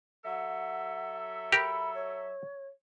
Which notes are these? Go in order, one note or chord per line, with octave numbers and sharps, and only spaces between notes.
F#3 A4 E5 F#5
G4 A#4 B5
C#5